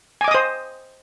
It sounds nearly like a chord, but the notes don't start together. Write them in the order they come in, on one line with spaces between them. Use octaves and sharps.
G#5 D6 D#5 D#6 C5